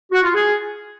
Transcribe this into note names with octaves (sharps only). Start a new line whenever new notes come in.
F#4
F4
G#4